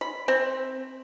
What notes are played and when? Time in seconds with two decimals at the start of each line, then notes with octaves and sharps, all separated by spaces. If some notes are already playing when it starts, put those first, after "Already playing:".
0.01 B5
0.28 C4